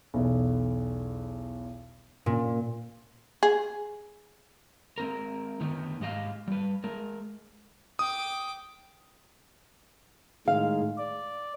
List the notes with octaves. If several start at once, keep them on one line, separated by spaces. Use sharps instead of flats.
B1 E2
A#2 C#4
G#4
G#3 C4 A#4
D3 D#3 B3 D#4
G#2 G#3 G4 D#5 F5
G3 B4
G#3 A#4
G5 D6 D#6
A2 D#3 G#3 F5
D5